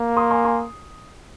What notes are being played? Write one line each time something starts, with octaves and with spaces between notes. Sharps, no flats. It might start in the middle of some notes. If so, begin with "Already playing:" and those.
Already playing: A#3
C6 D#6
G#5 C6
G#5 C6